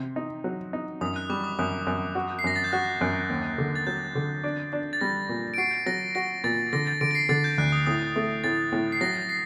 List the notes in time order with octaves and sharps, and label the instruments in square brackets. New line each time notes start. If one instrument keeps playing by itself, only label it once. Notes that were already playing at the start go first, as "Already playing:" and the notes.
Already playing: [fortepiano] C3
D#4
F#3
D#4
[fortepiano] F#2 [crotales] D#6
[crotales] F#6
[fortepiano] G3 [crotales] D6
[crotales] D#6
[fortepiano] F#2 [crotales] D#6
[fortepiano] F#2
F#4
[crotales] C7
[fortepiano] F#2 [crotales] A#6
[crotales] A6
G6
[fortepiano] F#4 [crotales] F#6
[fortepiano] F#2
D#2
D3
[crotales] A6
[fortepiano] F#3 [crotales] G6
[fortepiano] D3
D4
D4
[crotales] A6
[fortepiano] G3 [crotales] A#6
[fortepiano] A#2
[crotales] D7
[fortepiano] F#4 [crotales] C7
[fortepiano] F#3 [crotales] A#6
[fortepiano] F#4 [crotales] A#6
[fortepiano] A#2 [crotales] A6
[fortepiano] D3 [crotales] A#6
[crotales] A6
[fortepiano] D3 [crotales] D7
[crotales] A#6
C7
[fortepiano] D3 [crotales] A6
[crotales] G6
[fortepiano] D2 [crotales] F#6
[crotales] D#6
[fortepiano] A2 [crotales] D#6
[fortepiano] A3
[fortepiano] A2 [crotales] A6
[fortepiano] A2
[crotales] C7
[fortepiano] F#3 [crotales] A#6
[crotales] C7